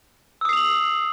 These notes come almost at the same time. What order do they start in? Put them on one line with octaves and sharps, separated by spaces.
E6 D#6 C7 F7 F#7